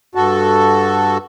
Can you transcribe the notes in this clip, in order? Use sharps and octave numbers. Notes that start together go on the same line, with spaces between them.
G2 F#4 A4